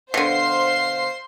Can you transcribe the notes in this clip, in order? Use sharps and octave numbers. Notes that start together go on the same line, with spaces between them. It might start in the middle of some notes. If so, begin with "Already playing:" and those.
B2 D3 C5 F5 C6 C7